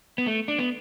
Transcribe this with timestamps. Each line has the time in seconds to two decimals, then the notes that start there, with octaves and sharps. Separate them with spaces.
0.18 B3
0.27 A3
0.48 D4
0.59 B3